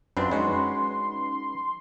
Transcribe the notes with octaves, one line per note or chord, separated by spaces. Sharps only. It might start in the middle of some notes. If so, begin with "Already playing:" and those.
F#2 C4 D4 F4 B4 C6
G#3 C#4 D#4 F#4 B4